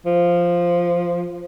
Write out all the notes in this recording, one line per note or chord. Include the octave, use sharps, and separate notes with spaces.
F3